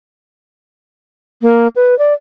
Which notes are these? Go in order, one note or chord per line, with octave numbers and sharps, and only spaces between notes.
A#3
B4
D5